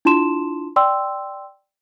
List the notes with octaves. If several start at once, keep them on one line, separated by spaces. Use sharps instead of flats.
D4 E4 F4 A5 C6 E7
D5 G5 C6 E6